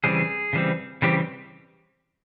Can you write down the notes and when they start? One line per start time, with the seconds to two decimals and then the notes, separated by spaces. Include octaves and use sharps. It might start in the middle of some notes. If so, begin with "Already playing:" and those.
0.04 C#3 E3 G3 C4 G#4
0.53 C#3 E3 G3 C4
1.02 C#3 E3 G3 C4 G4